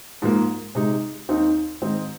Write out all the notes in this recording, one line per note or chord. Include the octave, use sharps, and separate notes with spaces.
G#2 F3 A#3
C3 G#3 D#4
D#2 D#3 C4 D#4
G#2 D#3 C4 D#4